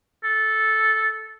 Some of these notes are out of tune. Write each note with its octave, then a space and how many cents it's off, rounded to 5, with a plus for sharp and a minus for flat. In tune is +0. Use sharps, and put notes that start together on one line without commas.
A4 -10